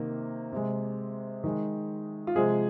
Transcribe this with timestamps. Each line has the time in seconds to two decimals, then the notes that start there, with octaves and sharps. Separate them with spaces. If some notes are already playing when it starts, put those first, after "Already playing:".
Already playing: C3 D#3 A#3
0.52 C3 G#3
1.44 D#3 G#3
2.27 F4
2.35 C3 F3 G#3 G#4